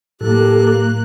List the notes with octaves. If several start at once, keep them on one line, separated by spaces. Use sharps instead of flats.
A2 F#3 A#3 G4 A4 F#6